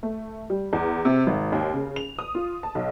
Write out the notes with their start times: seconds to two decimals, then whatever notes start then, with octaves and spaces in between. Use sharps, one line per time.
0.03 A3
0.50 G3
0.73 E2
1.05 C3
1.27 G#1
1.52 D#2
1.74 C#3
1.96 F7
2.19 D#6
2.35 F4
2.63 A5
2.75 B1